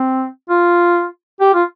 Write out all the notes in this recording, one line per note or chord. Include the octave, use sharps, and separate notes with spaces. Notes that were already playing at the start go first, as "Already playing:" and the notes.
Already playing: C4
F4
G4
F4